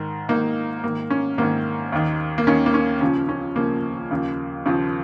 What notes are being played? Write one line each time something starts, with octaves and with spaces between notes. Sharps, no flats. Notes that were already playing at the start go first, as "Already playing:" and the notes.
Already playing: G#2 D#3
G#2 D#3 A#3 D#4
G#2 D#3 A#3
C#4
G#2 D#3 A#3
D#2 D#3
A#3
D#2 D#3 C#4
A#3
C#4
C#2 C#3 F3 C#4
C#4
C#2 C#3 F3 A#3
D#2 C#3 F3
D#2 C#3 F3